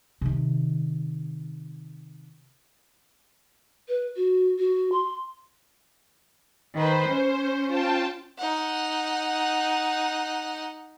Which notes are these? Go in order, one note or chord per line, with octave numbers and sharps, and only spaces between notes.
C3 D#3
B4
F#4
F#4
C6
D#3 B4 C5
C#4
F4 G5 A5
D#4 F#5